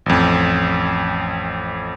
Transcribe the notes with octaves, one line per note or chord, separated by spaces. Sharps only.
A1 F2